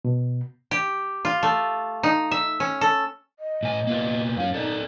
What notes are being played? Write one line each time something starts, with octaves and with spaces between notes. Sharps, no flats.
B2
G4
F4
A3
D#4
E5
C#4
A4
D#5
A2 G#5
A#3 B3 F4
F#2 C#4 F5
D#4 A4 D5 D#5